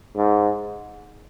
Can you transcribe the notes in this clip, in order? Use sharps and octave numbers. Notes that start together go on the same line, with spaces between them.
G#2